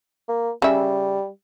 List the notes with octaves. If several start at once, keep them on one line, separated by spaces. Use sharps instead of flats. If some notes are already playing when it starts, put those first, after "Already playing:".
A#3
C#3 G3 E5